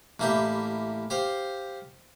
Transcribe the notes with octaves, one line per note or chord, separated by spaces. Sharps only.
A1 A#3 E4 G4 G5
G4 C5 F5